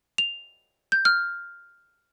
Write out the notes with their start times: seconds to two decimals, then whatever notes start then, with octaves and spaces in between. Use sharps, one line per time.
0.18 F7
0.92 G6
1.05 F6